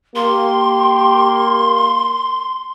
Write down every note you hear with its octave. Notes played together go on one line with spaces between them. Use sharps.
A#3 G4 C6